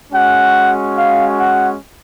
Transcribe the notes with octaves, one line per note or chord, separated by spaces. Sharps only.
G#3 C#4 F#4 F#5
F5
F#5